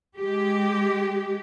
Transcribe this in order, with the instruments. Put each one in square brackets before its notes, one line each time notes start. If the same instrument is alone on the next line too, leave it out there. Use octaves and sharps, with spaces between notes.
[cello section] G#3 G4